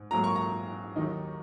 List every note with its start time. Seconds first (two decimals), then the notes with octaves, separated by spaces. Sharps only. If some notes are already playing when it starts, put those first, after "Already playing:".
Already playing: G#2
0.11 G#2 F#3 A#3 A#5
0.24 C#6
0.36 A#5
0.96 D#2 D#3 F#3 D#4